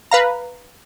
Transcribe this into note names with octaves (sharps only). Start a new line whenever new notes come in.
B4 F5 A#5